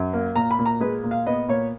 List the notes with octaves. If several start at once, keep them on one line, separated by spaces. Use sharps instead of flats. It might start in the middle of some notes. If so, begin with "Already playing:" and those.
Already playing: F#2
A#3
A#2 A#5
B5
A#2
A#5
G#3 B4
A#2
F5
B3 D#5
A#2 C#5